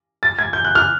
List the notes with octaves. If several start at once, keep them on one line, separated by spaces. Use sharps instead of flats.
A6
G#6
G6
F#6
F6